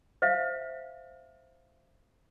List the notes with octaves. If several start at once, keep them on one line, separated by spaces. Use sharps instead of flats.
C5 E5 F5